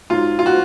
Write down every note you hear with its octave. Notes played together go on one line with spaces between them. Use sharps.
G#2 F#3 F4
F4
F#4